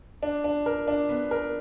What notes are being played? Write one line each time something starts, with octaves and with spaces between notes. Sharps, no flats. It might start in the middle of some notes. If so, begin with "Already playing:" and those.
D4
D4
A#4
D4
B3
A#4